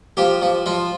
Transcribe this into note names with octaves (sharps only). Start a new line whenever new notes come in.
F3 G4
F3
F3 F4